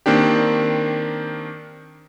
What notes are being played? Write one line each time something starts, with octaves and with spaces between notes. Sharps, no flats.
D#3 A#3 C4 D4 G4